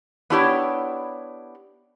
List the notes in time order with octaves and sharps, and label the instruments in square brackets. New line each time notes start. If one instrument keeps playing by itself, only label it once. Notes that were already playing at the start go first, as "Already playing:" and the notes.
[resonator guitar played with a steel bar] B3 D4 E4 G4 C5 C#5